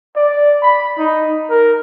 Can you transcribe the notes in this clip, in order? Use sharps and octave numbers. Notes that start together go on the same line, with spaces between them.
D5
B5
D#4
A#4